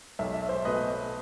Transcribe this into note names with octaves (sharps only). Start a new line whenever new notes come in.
B1 E5
E5
C5 E5
B2 A3 B4 D#5